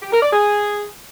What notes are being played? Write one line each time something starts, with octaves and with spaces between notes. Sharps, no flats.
G4
A#4
D5
G#4